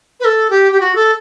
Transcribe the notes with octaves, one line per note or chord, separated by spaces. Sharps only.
B4
A4
G4
G4
F#4
A4